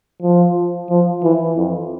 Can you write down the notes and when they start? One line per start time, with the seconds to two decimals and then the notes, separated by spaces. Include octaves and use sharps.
0.22 F3
0.90 F3
1.24 E3
1.57 F2